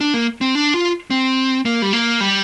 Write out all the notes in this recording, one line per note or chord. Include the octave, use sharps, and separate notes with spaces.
D4
A#3
C4
D4
F4
C4
A#3
G3
A#3
G3